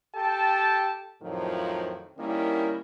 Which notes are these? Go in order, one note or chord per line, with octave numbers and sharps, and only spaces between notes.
G4 A4 G5 A5
F2 A2 D#3 F3 F#3
D#3 G3 A#3 C#4 E4